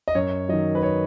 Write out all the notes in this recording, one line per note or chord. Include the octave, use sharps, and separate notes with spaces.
D#5
F#2 C#5
D#3 F#3 D#5
B4
C#5